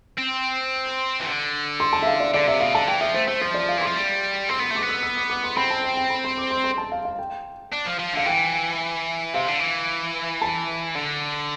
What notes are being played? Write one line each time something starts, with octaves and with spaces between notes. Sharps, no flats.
C4
E3
D3
C6
A5
E5
F5
D5
D3 D5
C3 E5
B2 F5
D3 A5
E3 G5
F3 E5
A3 C5
A3 C5
F3 C5
D5
F5
E3 C6
F3
G3
C4 C6
B3 C6
A3 D6
B3
E6
E6
D6
D6
C6
C4 B5
A5
G5
G5
B5
C6
D6
C6
C6
A5
F5
F5
G5
D4
F3
F3
D3 F5
E3 G5
C3 F5
D3
E3
A5
D3